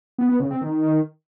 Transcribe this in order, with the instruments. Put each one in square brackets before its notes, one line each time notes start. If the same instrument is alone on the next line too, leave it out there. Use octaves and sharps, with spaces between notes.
[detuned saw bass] B3
B3
C#3
C4
D#3